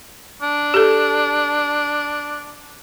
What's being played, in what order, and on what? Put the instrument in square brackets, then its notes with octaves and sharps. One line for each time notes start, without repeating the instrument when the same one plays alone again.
[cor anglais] D4
[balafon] G4 A4